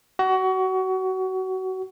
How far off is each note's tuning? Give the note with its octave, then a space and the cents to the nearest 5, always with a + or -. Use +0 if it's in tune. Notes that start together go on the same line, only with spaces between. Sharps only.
F#4 +25